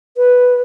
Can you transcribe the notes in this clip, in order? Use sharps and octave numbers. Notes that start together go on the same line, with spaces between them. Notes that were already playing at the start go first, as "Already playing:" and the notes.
B4